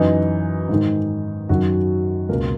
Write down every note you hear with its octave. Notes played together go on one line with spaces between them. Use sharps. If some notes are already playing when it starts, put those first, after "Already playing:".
Already playing: F#2 E3 D#4
G#2 D#3
F#2 D#3 F#3 F#4
C#2 B2 A#3 A#4